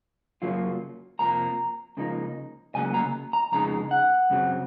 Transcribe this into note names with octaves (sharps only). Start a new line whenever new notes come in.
F#2 C#3 F#3 A#3 F4
F2 C3 F3 A#3 A#5
C#2 C#3 F3 A#3 D#4
C#2 C#3 F#3 A#3 G#5
A#5
A#5
F2 C#3 G#3 D#4 A#5
F#5
F#2 C#3 F#3 C4